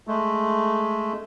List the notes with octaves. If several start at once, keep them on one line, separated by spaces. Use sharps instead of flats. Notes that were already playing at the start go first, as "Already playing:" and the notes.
G#3 A3